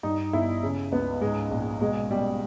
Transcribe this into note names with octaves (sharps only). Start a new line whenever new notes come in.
G2 D#4
G1 E4
C#3
C#2 B3
G#2 G#3
A#1
B2 G#3
B2 G3